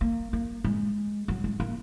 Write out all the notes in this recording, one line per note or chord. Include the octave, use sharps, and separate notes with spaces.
A#3
A#3
G#3
F#3
G#3
A#3